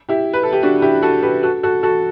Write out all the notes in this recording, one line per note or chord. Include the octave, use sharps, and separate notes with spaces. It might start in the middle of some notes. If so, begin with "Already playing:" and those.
E4 G4
B4
A4
G4
D4 F#4
E4 G4
F#4 A4
G4 B4
F#4 A4
F#4 A4
F#4 A4